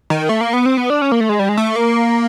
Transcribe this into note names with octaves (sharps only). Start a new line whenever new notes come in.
D#3
A3
A#3
B3
C4
B3
D4
C#4
A#3
A3
G#3
G3
G#3
A3
A#3